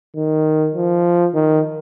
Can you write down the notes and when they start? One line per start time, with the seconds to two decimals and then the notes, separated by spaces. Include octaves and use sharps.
0.16 D#3
0.74 F3
1.34 D#3